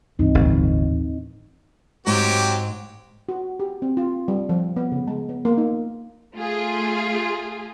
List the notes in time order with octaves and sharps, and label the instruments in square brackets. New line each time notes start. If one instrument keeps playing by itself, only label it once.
[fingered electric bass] C#2 G2 E3 [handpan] C4 D#4
[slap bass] G1 [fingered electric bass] D#2 A2 E3
[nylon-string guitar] G#2 [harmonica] F#3 C4 G4
[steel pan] F#4
G4
C4
F4
G3
F3
B3
C#3
G#3
B3
A#3
D#4
[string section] A3 F4 G#4